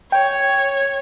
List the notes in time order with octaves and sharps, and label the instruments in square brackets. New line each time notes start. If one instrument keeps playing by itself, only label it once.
[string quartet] C#5 [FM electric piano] G5